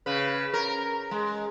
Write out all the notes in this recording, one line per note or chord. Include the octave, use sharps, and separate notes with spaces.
C#3 B4
A#4
G#3